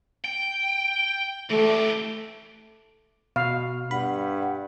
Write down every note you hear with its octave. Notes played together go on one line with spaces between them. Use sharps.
G5
E3 A3 G4
B2 F5
G2 F#5 B5